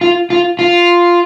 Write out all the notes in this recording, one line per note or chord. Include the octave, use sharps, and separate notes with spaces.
F4
F4
F4